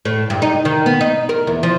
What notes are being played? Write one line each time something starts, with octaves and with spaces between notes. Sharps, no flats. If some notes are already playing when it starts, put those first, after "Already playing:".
A2
G2
D#4
D#3
B3
D#4
A#4
E2
F3